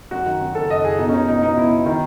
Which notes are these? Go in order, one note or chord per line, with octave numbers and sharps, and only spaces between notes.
F#2 F#4
D#3
F#2
F#1 A4
F#1 D#5
F#1 G#4
B2 D#4
C#4
C#2 D#4
B2 D#4
B2 D#4
B2 E4
B2
D#3